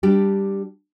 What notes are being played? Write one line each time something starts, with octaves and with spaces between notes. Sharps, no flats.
G3 D4 G4